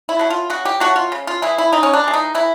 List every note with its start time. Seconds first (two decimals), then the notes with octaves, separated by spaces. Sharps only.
0.09 E4
0.19 F#3 A3
0.30 F4
0.50 C#3 F#4
0.65 G4
0.80 F#3 A3 F#4
0.96 F4
1.12 C#3
1.27 F4
1.42 E3 G#3 E4
1.58 E4
1.73 C#3 D#4
1.83 C#4
1.93 D4
2.04 E3 G#3
2.14 D#4
2.34 E3 E4